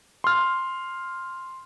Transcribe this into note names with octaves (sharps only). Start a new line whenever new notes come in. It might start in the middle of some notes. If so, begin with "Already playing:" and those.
C6 F6